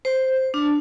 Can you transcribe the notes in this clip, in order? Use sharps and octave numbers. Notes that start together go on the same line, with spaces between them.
C5
D4